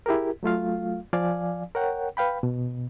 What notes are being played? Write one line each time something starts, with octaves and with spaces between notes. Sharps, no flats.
E4 G4 G#4 A#4
F#3 A3 F4 F5
F3 D5 F5 G#5
A#4 C#5 F#5 G5
B4 F5 G5 B5
B2